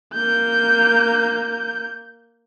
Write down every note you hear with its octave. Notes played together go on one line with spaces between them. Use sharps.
A#3 G6